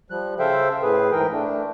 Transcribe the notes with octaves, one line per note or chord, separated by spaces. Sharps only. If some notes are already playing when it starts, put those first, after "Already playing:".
F3 G3 F#6
C#3 A4 C5 E5 F5 G5
A2 G#4 B4
G#2 E3 A#4 G5
A3 D4